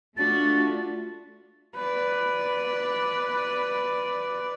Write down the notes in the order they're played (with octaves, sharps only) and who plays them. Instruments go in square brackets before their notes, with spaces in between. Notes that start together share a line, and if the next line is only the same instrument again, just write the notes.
[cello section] A3 D4 [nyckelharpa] F4 F#4 [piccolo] A6
[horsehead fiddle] B4 D5